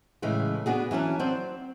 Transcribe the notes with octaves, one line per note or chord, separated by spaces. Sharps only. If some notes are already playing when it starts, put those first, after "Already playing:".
A2 C#3 E3 G#3
B3 D4 F#4 G#4
E3 F#3 C#4 A5
F#3 C4 C5 D5